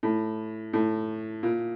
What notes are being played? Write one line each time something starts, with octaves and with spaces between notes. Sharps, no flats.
A2
A2
A#2